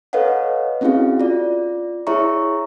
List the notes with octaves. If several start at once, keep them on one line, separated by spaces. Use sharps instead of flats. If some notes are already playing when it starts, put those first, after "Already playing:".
A4 B4 C#5 D#5 F5 F#5
C4 C#4 E4 F#4 G#4 F5
F4 D5
E4 G#4 C#5 E5 A#5 C#6